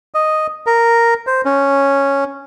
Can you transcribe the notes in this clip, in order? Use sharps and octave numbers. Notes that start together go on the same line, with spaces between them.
D#5
A#4
C5
C#4